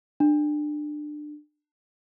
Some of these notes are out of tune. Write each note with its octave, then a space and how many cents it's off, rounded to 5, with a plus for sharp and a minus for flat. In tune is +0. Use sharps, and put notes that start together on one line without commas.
D4 +25